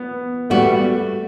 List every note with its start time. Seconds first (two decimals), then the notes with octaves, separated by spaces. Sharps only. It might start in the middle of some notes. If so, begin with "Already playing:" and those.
Already playing: B3
0.50 G3 A3 B3 F#4